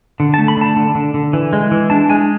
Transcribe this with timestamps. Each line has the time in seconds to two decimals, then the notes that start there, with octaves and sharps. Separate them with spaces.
0.20 D3
0.34 A5
0.38 A3
0.48 B5
0.57 D3 A5
0.76 D3
0.95 D3
1.14 D3
1.33 E3
1.53 G#3
1.71 E3
1.90 D4 A5
2.10 G#3 G#5